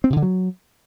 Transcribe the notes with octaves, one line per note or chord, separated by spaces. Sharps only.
C4
C3
D3
F#3